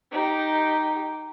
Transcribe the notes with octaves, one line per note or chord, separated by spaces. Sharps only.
D#4 G4